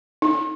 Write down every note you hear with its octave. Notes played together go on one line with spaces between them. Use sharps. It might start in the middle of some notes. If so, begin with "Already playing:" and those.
D#4